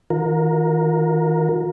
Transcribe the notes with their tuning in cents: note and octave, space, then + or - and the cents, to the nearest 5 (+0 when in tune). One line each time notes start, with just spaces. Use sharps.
D#3 +40 F4 +40 A#4 +0